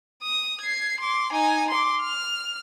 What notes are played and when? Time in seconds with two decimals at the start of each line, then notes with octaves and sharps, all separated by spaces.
0.23 D#6
0.61 G#6 C7
1.00 C6 D6
1.32 D#4 G#5
1.70 C6 D6
2.02 F6